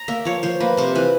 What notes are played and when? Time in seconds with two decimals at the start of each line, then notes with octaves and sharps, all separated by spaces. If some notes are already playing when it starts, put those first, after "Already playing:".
Already playing: A#5
0.08 A#3 E5
0.25 F3 C#5
0.43 F3 C5
0.60 A#3 B4
0.77 C3 C5
0.95 E3 B4